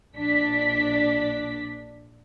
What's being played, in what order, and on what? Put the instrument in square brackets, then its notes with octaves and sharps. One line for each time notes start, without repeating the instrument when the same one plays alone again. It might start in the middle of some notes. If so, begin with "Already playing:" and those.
[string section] A#1 D4 B6